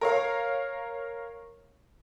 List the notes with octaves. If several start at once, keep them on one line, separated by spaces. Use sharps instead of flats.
A#4 C#5 F5